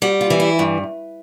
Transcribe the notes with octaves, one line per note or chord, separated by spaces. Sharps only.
G3 F#4
F4
E3
E4
G2